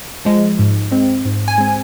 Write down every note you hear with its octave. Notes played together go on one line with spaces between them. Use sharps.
F3 G#3
G#2
G#3 C4
G#2
G#5
G#3 C4